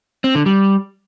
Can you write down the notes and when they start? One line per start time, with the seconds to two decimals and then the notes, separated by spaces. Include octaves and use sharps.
0.24 C4
0.35 D3
0.46 G3